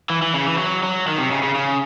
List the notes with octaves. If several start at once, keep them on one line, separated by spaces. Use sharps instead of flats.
E3
E3
C#3
E3
F#3
F#3
D#3
C3
C#3
C#3
C#3